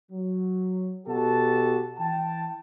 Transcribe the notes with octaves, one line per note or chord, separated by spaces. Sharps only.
F#3
B2 F#4 G4 A4 A5
E3 G5 A5